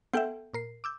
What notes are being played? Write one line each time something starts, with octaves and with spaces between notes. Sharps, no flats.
B3 A4 E5 G5 G6
A#2 A#4 C7
D6 E6 G6